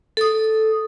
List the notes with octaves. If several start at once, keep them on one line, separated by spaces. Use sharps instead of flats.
A4 D#6